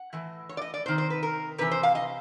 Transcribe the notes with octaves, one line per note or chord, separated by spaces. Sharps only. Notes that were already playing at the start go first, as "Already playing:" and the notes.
Already playing: F#5
A2 E3
C#5
D5
D#5
D5
C3 D#3 C5
C5
B4
A#4
C3 E3 B4
C5
F5
D#5